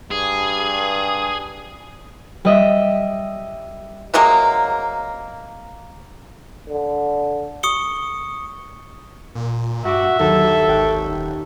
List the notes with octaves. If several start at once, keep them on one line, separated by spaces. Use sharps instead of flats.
G2 G#4
G3 D#5 E5
C3 F#3 G#3 A#3
D3
C#6 D#6 C#7 G7
A#2
G2 F#4 E5 F#5 D6
D#2 F#3 A4
G#1 C#5 G5 F#6
D#1